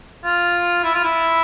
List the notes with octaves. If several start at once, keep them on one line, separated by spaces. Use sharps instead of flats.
F4
E4
F4
E4